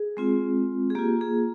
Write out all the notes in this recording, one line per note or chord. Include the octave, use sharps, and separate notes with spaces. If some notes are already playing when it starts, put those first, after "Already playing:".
Already playing: G#4
G#3 C4 F4
G#4
A#3 F4 G4
G#4